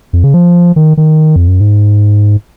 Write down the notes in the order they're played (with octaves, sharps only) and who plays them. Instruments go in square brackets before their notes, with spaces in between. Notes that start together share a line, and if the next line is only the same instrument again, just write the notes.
[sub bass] F2
C#3
F3
D#3
D#3
F2
F#2
G#2